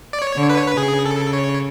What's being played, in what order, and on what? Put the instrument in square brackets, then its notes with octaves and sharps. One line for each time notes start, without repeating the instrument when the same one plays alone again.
[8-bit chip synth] D5
C#5
[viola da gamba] D3
[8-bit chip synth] B4
C#5
B4
[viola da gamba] C#3 [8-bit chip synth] G#4
[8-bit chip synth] A4
C#5